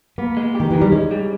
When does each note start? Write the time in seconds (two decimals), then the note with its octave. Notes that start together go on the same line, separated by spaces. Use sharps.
0.18 A#3 B3
0.37 G#3
0.55 G4
0.60 D#3
0.71 D#3 E3
0.81 G3
0.92 G#3 C#4
1.11 G3